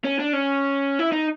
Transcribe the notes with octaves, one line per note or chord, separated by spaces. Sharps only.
C#4
D4
C#4
E4
D#4